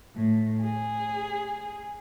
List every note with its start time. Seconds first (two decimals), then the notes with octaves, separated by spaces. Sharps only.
0.14 A2
0.62 G#4